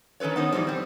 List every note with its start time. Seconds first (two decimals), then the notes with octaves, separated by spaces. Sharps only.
0.20 D#3 C#4 A4 B4 C#5
0.36 B3 D#4 C5 C#5
0.52 G#2 B2 E3 F3 G3
0.67 G3 C4